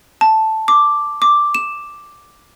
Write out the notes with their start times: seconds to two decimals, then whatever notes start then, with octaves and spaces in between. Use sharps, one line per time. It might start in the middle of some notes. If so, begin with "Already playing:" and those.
0.21 A5
0.68 D6
1.22 D6
1.55 E7